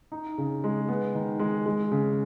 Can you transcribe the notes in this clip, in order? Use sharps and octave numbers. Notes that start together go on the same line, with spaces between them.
D#4
C#3
G#3
B3
D#3
G#3
G#3
C#3